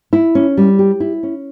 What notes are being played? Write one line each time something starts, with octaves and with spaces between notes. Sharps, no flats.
E4
C#4
G3
G4
E4
C#4